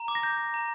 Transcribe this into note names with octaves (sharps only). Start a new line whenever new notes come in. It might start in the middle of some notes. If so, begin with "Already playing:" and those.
Already playing: A#5
D6
A#6
G6
G6
A#5